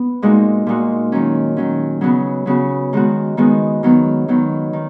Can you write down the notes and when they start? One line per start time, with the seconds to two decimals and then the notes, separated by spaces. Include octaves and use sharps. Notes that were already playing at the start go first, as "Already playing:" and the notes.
Already playing: B3
0.22 A#2 G#3 D#4 F#4
0.67 A#2 G#3 D#4 F#4
1.12 D#3 F#3 C#4
1.57 D#3 F#3 C#4
2.01 C#3 F#3 B3 F#4
2.46 C#3 F#3 B3 F#4
2.93 D#3 G#3 B3 F#4
3.37 D#3 G#3 B3 F#4
3.83 D#3 F#3 B3
4.28 D#3 F#3 B3
4.73 D#3